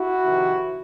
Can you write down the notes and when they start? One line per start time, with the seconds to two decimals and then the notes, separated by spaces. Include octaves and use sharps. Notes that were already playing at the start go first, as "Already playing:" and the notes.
Already playing: E4 F#4
0.24 F2 C3 D#3